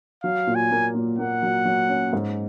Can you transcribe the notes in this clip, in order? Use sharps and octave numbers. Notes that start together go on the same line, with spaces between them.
F#3 F5
A#2
G#5
A#3
A#2
A#3 F#5
F#3
F#3
C#4
G#2